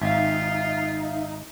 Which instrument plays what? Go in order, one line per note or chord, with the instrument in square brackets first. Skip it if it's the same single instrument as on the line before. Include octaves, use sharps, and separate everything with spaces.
[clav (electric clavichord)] G#1 [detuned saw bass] D#4 [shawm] F4 [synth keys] E5 F5